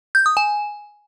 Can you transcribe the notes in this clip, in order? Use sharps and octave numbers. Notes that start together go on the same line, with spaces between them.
G6
D#6
G#5